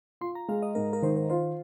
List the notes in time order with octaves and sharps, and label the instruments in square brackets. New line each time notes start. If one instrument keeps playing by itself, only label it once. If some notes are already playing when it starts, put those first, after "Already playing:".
[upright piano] F4 [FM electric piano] C6
[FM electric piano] A#5
[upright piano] G#3 [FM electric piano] F5
[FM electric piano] D#5
[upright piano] G#2 [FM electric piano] A#4
[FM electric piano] A#4
[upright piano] D#3 [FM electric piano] C5
[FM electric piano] C5
[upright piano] F4 [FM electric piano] C5